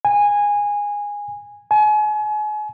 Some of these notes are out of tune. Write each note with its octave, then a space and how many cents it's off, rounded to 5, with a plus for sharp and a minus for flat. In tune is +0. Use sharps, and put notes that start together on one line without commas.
G#5 -15
G#5 +35